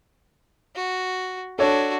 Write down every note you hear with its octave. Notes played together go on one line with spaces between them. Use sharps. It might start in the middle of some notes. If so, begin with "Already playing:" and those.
F#4
D4 F#4 A4 C#5